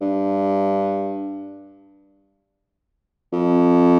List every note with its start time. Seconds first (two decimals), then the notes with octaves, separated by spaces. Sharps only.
0.01 G2
3.33 F2